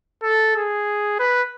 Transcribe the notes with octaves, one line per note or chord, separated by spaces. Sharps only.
A4
G#4
B4